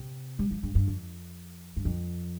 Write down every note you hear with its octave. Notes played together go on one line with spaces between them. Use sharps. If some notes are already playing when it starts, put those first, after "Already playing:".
Already playing: C3
G3
F3
G2
G2
F2
G2
F2